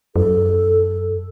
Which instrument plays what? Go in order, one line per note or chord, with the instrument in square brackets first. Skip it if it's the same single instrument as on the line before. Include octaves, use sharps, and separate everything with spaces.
[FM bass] F#2 [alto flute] A4